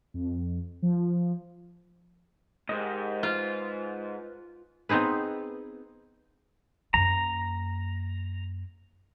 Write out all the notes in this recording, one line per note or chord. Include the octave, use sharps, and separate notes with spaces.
F2
F3
G#2 G4 A#4 D#5
F4 B4 F6
B3 C4 D#4 G#4 B4
F#2 A#3 A#5